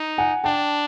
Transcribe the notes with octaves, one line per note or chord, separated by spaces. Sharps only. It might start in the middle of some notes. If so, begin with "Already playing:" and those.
Already playing: D#4
F#5 G#5
D4 G5 A5